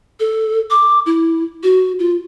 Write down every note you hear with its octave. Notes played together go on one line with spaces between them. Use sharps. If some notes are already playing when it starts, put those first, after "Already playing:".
A4
D6
E4
F#4
F4